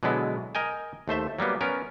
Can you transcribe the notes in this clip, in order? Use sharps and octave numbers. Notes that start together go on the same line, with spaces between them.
B2 D3 F#3 G#3 B3 E4
A#4 D#5 G5 G#5
D#2 A3 C5 E5
F#3 G3 A#3 B3
B3 C#4 A#4